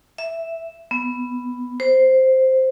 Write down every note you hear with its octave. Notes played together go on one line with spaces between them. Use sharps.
E5
B3
C5